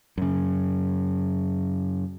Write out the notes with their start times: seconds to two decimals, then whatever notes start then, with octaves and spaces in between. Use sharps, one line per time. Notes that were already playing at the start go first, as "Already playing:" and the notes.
0.18 F#2 C#3